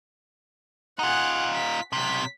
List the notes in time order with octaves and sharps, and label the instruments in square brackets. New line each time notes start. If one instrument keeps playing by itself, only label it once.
[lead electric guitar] D#4 F4 [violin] G#4 F#5
[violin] B6
[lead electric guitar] B1 C3 [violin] B6